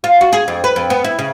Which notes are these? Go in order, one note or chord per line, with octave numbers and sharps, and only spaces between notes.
F4
F#4
G#4
F2
B4
F2
B3
E4
C#3